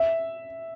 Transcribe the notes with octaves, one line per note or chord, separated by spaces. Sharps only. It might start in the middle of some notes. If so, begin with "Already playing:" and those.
Already playing: E5